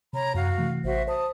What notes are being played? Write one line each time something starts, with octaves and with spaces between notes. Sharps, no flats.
C3 C#5 A#5 B5
F#2 F#4 F5
C3 E3 A3
A1 F#4 C5 E5
C5 A5 D#6